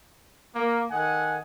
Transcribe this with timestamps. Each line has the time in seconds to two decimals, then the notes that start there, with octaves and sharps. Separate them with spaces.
0.54 A#3
0.90 D#3 A4 D#5 F#5 G#5